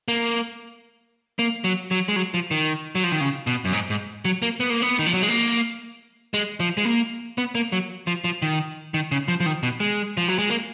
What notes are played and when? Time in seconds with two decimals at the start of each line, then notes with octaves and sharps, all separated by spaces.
0.08 A#3
1.39 A#3
1.64 F#3
1.91 F#3
2.08 G#3
2.16 F#3
2.34 F3
2.51 D#3
2.95 F#3
3.04 F3
3.12 D#3
3.21 C#3
3.47 B2
3.65 F#2
3.73 G#2
3.90 G#2
4.25 F#3
4.42 A#3
4.60 B3
4.70 A#3
4.82 B3
4.99 D#3
5.06 F3
5.14 F#3
5.22 G#3
5.29 A#3
6.34 G#3
6.60 F3
6.77 G#3
6.85 A#3
7.38 B3
7.55 A#3
7.72 F#3
8.07 F3
8.24 F3
8.42 D#3
8.94 D#3
9.12 C#3
9.28 F3
9.40 F3
9.46 D#3
9.63 B2
9.80 G#3
10.17 F3
10.28 F#3
10.39 G#3
10.50 A#3